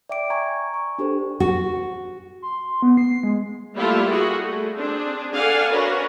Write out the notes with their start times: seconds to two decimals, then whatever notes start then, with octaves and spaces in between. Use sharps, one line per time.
0.09 D5 E5 G5 D6 D7
0.30 G#5 A#5 C#6 G#6
0.74 C#6
0.98 D4 G4 A4 C5
1.40 F#4
2.42 C6
2.82 B3
2.97 C7
3.23 G#3
3.76 G3 A3 A#3 E4 F4 A4
4.09 F#4 G#4
4.42 A3
4.78 C4 D4 G#4
5.34 A4 D5 F5 F#5 G#5
5.71 C#4 D4 F#4 A#4 B4